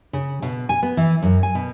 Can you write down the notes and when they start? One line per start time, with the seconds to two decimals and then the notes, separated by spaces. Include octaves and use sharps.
0.13 C#3
0.42 B2
0.69 G#5
0.83 B3
0.97 E3
1.23 F#2
1.43 G#5
1.55 B2